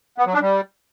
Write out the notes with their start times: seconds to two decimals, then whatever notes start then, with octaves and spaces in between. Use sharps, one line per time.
0.18 B3
0.26 F#3
0.34 D4
0.42 G3